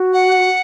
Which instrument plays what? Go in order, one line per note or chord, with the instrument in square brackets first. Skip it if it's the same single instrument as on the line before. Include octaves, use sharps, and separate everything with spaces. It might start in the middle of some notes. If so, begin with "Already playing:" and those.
Already playing: [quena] F#4
[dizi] F#5